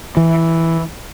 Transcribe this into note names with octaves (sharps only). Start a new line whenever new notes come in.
E3